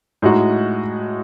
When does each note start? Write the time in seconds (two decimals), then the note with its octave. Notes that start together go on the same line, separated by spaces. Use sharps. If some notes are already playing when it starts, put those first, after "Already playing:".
0.22 A2 G#3 D#4 F#4